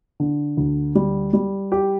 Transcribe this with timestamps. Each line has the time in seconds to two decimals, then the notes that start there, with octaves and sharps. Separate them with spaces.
0.20 D3
0.57 D2
0.95 G3
1.33 G3
1.72 G4